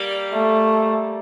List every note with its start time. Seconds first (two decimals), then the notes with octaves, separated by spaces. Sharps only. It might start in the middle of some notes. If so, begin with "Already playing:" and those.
Already playing: G3 A#3
0.33 A3